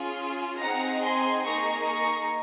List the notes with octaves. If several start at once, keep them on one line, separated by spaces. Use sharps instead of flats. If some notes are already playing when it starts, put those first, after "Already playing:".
Already playing: C#4 F4 G#4
C4 D#4 G#4 F#5 A#5
G#5 C6
A#3 D#4 G#4 A#5 C#6
A#5 C#6